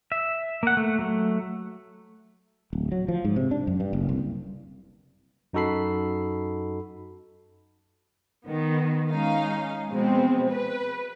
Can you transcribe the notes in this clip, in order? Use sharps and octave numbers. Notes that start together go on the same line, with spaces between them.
E5
A#3 F#5
A3
F#3 A3
D1
F#3
F3
G#2
C3
D4
F#2
G2
F#1
C2
F#2 D#4 F#4 A4 B5 C7
D#3 B3
G#3 C#4 D#4 F5
B2 F3 G#3 C4
B4